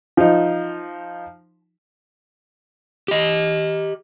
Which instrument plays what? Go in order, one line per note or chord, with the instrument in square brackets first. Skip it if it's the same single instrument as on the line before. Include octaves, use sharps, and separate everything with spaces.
[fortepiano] F3 D#4
[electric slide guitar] G4 D#5